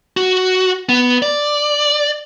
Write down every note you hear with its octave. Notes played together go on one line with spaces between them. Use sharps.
F#4
B3
D5